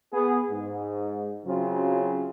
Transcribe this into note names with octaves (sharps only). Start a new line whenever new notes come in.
B3 G#4
G#2
F#2 C#3 F#3 C4 F4